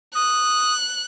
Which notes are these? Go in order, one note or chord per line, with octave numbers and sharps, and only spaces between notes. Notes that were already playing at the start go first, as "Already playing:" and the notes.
D#6 F#6